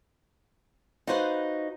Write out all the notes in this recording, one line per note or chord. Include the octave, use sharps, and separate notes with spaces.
D#4 F4 F#4 B4 C5